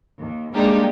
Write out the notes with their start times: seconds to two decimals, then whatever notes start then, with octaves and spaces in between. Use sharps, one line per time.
0.18 D#2
0.54 G3 G#3 A#3 D4 D#4 G4